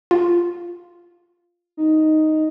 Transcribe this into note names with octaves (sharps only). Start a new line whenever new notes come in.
F4
D#4